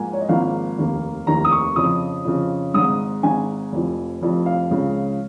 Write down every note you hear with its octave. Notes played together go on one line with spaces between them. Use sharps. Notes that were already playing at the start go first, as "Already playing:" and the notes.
Already playing: G#2 F3 A#3 G#5
C#5
D#5
G#1 G#2 F3 A#3 F5
F1 D#2 D#3 A#3
F1 D#2 D#3 A#3 A#5
D#6
C#6
F2 C#3 F3 D#6
F2 C#3 F3
G#1 G#2 G#3 D#6
G#1 G#2 G#3 G#5
F1 F2 F3
F1 F2 F3
F5
C#2 C#3 F3 G#3